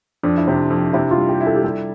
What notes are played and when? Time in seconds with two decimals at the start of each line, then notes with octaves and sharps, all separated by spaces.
0.23 F2 D4
0.37 E4
0.48 C3 D4
0.70 F2
0.93 C3 E4
1.11 F4
1.17 G3
1.29 G4
1.41 E4
1.47 A4
1.56 G4
1.64 G3 A4